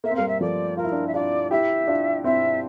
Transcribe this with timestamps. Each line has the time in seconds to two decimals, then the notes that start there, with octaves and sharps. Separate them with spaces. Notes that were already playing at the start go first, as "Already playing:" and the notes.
0.04 A#3 E5
0.11 C4
0.15 G3 A#3 F5
0.27 E5
0.41 F3 A3 D5
0.77 F4 A#4
0.84 E4
0.92 D4 F4
1.07 E5
1.14 D4 F4 D5
1.51 E4 G4 E5
1.87 D4 F4
2.24 C4 E4 E5